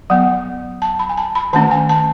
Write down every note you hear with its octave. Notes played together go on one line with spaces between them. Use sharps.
F#3 B3 F#5
A5
B5
G#5
A5
B5
D#3 A3 C#4 A5
G#5
A5